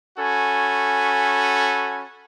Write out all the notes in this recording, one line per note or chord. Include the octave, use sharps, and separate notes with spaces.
C#4 F#4 A4 G#5 B5